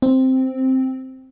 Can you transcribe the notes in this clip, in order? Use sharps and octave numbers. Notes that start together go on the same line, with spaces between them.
C4